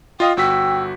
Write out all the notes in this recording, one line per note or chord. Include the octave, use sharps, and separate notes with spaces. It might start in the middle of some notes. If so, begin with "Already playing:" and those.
F4 D#5 F5 G5 D#6
G1 F#4 G5 E6 B6